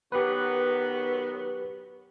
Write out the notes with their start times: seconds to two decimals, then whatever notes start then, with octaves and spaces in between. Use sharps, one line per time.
0.12 D#3 F#3 B3 G4 B4